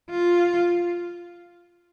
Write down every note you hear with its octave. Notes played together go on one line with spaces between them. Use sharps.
F4